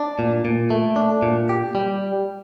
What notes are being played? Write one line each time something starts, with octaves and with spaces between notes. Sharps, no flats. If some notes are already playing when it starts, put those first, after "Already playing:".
Already playing: D4
A#2
A#2
A3
D4
A#2
G4
G3